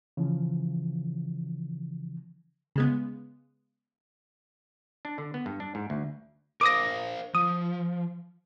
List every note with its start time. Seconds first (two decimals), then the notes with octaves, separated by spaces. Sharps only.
0.17 C#3 E3 F3
2.76 C#3 G#3 B3
5.05 D4
5.18 D3
5.34 B3
5.46 G2
5.60 D4
5.75 G#2
5.90 D2
6.61 A#4 C5 F5 D6 D#6 A#6
7.35 F3 D#6